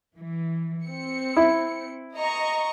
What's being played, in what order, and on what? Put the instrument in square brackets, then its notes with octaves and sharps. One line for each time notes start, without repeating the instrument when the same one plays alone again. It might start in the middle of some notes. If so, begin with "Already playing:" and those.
[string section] E3
C4 C#7
[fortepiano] E4
[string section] D#5 A#5 C#6